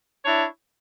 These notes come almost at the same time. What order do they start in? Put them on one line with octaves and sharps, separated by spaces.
C#5 D4 E4